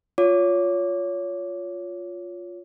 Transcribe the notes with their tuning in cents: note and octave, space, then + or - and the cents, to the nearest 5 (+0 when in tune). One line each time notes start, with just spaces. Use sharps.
F4 +10 C#5 +20 D6 +0